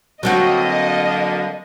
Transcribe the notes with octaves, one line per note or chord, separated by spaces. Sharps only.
D3 F#3 A#3 C4 F#4 D#5